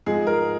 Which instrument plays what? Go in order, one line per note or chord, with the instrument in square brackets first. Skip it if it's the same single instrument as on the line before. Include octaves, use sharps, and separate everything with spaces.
[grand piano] G#2 F3 G#3 G#4
A#4